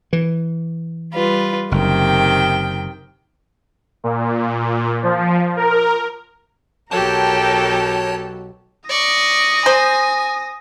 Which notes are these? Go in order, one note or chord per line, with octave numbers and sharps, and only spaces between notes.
E3
G3 F4 B4
F#1 C3 D#3 G5
A#2
A#2
F3
A#4
B1 F#3 G4 A4 A#4 C#5 G5 A5
D5 C#6 D#6 A#6
C5 G#5